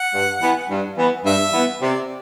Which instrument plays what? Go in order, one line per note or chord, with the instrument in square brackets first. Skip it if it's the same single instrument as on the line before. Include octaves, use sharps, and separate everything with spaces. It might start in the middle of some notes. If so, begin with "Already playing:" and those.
Already playing: [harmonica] F#5
[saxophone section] G2
E3 B3
G2
E3 B3
[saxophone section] G2 [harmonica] E5
[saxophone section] E3 B3
[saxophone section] C3 [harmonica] D5